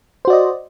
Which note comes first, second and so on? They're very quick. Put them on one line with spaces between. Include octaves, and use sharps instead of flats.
C5 F#4 D5 D#5